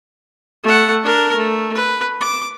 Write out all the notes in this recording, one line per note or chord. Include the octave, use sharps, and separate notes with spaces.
A3 F#5
D4 A#4
A3
B4
D6